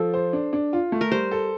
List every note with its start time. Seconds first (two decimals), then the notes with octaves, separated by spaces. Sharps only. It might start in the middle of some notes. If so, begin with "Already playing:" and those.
Already playing: F3 A4
0.14 C5
0.33 D4
0.53 D4
0.73 F4
0.92 A3
1.01 A#4
1.12 G3 C5
1.31 A4